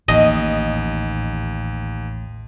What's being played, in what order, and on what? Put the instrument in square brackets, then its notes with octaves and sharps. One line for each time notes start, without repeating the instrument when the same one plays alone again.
[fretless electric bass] A1 [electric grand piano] D#2 [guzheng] D#5